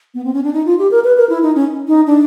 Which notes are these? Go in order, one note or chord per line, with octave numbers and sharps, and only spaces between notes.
B3
C4
C#4
D4
D#4
F4
G4
A#4
B4
A#4
E4
D#4
C#4
D#4
D4